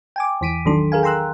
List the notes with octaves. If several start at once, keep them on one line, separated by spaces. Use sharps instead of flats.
G5 G#5 D6
E2 E3 B6 D7 D#7
A1 D#3 F#3 D4 A4 C6
G#4 A#4 F5 G#5
G5 A#5 C6 E6 F#6